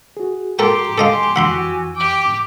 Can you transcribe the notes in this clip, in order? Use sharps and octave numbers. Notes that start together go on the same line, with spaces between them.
F#4 G#4
G4 A4 A#4 G5 A#5 C6
A4 D#5 F5 G#5 C6
F2 E3 F#4 F#5 G#5 B5 C6 E6
G4 G5 D6